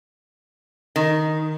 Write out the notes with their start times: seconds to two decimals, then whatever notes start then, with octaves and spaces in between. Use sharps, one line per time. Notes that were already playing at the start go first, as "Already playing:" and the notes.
0.96 D#3